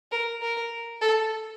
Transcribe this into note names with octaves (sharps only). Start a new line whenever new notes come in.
A#4
A#4
A4